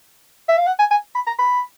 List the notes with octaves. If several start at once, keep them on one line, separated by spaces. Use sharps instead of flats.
E5
F5
F#5
G#5
G#5
B5
A#5
B5